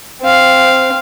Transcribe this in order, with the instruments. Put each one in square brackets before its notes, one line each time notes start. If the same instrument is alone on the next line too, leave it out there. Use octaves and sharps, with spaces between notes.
[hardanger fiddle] C4 F5